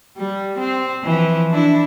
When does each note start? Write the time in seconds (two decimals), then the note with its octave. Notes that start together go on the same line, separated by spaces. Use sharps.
0.18 G3
0.58 C4
1.05 E3 F3
1.50 D4 E4